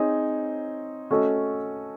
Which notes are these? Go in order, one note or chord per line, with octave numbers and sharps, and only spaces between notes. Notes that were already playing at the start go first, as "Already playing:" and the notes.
Already playing: C4 D#4 G#4 C#5
A3 C#4 F#4 A4 D#5